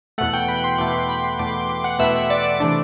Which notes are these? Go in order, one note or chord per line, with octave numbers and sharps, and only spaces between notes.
E2 B2 A3 F#5
G5
B5
C6
E2 B2 A3 D6
C6
B5
C6
E2 B2 A3 D6
C6
D6
F#5
E2 B2 A3 E5
E5
D5
D5
C3 E3 A3 D4